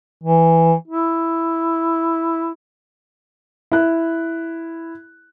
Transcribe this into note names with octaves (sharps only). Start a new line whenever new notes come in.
E3
E4
E4 F#6